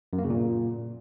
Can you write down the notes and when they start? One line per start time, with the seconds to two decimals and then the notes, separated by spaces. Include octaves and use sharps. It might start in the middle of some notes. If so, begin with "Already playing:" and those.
0.13 F#2
0.18 A#3
0.24 C#3
0.30 A#2